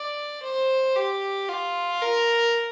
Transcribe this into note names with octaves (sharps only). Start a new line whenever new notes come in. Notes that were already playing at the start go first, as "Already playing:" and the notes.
Already playing: D5
C5
G4
F4
A#4